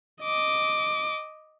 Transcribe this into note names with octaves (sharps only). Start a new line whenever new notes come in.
D#5 D6